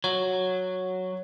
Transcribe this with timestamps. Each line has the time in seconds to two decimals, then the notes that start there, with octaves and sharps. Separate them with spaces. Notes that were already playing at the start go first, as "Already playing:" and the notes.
0.04 F#3 C#5